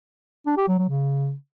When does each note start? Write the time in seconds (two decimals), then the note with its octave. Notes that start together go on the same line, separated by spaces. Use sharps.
0.47 D4
0.57 G4
0.68 F#3
0.78 F#3
0.89 C#3